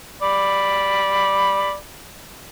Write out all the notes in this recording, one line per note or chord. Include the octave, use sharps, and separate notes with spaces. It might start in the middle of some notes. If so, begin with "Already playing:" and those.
D5 B5